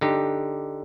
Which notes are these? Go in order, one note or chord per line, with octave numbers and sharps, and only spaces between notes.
D3 D#4 G4